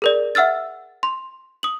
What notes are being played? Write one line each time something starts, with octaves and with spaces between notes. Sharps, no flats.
G#4 A#4 D5
E5 F#5 E6 F6 A6
C6
D#6 F#7